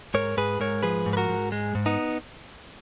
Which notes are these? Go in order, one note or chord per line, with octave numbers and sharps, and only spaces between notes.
G#2 A#4 C#5
G#2 G#4 B4
G#2 A#4 C#5
F3 G#4 B4
G#2
B4
F#4 A#4
G#2
G#3
G#2
B3 D#4